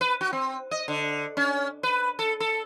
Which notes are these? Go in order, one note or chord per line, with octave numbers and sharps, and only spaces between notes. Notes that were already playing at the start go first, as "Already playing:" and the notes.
B4
F#4
C4
D#5
D3
C#4
B4
A4
A4